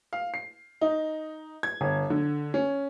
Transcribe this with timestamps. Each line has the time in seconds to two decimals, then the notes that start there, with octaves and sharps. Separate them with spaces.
0.13 F5
0.34 C7
0.81 D#4
1.63 G#6
1.81 G1
2.10 D3
2.54 C#4